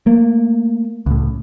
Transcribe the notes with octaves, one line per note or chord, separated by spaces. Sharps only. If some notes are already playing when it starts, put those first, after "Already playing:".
A3 A#3
C#2 A2